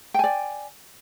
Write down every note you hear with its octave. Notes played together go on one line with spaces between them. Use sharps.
D5 G5 G#5